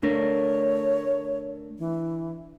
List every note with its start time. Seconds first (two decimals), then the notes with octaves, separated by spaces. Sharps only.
0.03 A3 D4 A#4 C#5
1.79 E3